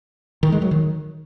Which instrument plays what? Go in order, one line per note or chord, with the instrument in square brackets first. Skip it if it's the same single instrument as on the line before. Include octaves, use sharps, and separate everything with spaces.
[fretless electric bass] D#3
G#3
F#3
D#3